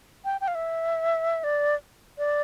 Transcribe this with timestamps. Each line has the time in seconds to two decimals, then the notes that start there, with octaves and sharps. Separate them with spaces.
0.25 G5
0.41 G5
0.48 F5
0.55 E5
1.44 D5
2.18 D5